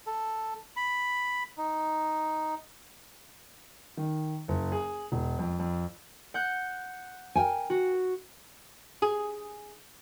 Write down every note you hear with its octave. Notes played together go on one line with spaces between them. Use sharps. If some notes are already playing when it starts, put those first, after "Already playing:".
A4
B5
D#4
D#3
F#1
G#4
E1
F2
F2
F#5 F#6 G6
A#4 G5 G#5
F#4
G#4